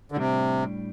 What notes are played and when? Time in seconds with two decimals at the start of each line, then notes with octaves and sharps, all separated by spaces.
0.12 D3
0.17 A2 C3 G3 D4